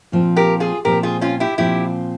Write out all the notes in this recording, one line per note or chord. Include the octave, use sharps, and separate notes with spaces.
A#2 F3 C4
G4 A#4
F4 G#4
A#2 F3 C4 G4 A#4
F4 G#4
C#4 F4
E4 G4
A#2 F3 C4 E4 G4